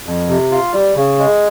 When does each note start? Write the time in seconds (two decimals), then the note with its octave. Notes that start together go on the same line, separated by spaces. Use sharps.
0.06 F2
0.29 C3
0.51 F4
0.73 G3
0.96 C#3
1.18 G#3